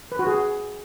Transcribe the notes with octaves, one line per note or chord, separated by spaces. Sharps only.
B4
F#4
G#4